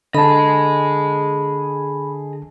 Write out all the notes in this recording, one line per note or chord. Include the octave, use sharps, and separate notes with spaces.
D3 G#4 D#5 A5 B5